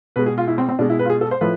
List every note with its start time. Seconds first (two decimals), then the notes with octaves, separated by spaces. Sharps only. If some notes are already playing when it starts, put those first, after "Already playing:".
0.16 B2 G#3 B4
0.26 G#4
0.38 F4
0.48 E4
0.58 C4
0.69 C4
0.79 B2 G#3 D4
0.90 E4
0.99 B4
1.05 F4
1.10 G#4
1.21 A4
1.31 C5
1.41 A2 F3 B4